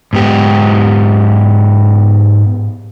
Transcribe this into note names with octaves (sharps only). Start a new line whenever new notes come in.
G#2 B3 G4